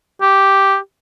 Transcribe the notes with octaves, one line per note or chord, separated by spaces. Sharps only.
G4